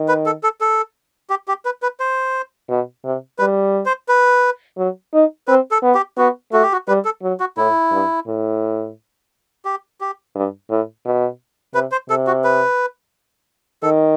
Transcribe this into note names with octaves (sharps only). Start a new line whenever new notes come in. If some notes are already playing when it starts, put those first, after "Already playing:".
Already playing: D#3
B4
A4
A4
A4
G4
G4
B4
B4
C5
B2
C3
G3 B4
C5
B4
F#3
D#4
C4 B4
A4
B3
G4
B3 F#4
A3 F#4
G4
F#4
G3 B4
A4
F#3
F#4
A2 E4
G2
A2
G4
G4
G2
A2
B2
C3 B4
C5
C3 A4
F#4
B4
D#3 A4